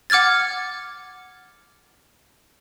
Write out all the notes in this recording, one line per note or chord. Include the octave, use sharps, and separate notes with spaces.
F#5 D6 F6 G#6 A6